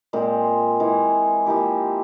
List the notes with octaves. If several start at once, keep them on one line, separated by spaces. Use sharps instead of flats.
A#2 G#3 C4 F4
E3 G#3 E4
F3 A#3 E4 G4